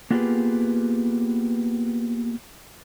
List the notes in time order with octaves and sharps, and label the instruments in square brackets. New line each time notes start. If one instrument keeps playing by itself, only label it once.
[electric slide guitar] A#3 B3 F4 G4 G#4 B4